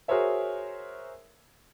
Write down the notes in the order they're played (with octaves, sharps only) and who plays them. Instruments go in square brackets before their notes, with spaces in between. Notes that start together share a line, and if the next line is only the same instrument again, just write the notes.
[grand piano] F#4 G#4 A#4 C5 C#5 E5